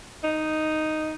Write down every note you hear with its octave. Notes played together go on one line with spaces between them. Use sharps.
D#4